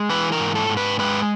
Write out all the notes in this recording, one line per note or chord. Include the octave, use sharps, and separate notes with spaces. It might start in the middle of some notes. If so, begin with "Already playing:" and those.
Already playing: G#3
E3 B4
A#4
G#2
A4
G#2
B4
G#3 B4